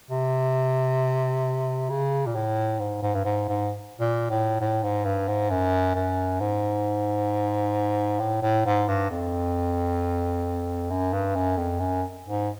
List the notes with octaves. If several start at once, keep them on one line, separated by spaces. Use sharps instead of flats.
C3
C#3
A#2
A2
G#2
G#2
G2
G#2
G#2
A#2
A2
A2
G#2
G2
G#2
F#2
F#2
G#2
A2
A2
G#2
G2
F2
F#2
G2
F#2
F2
F#2
G#2